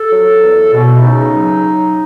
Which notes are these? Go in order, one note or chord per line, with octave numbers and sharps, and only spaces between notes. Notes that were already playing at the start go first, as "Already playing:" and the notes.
Already playing: A4
F#3
E2
B2
E4
C#3 D#4
F#3